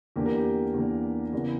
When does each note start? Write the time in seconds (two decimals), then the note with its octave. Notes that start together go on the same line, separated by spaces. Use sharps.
0.16 E2 D3 A#3 G4
0.26 A#4
0.37 G4
0.74 E2 D3 A#3
1.33 E2 C#3 E3 B3 A#4